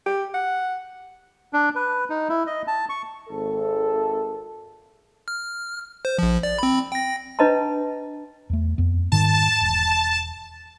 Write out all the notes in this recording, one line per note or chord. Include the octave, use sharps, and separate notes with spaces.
G4
F#5
D4
B4
D#4
E4
D#5
A5
C#6
G#1 A4
F6
C5
A#1 F3
D5
C4 B5
G5 A#6
D4 B4 D#5 A5 A#5
E2 A3
F2 B3
G#2 D#3 G3 A5
E1